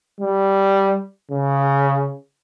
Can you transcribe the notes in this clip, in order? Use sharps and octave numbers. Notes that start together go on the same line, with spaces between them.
G3
C#3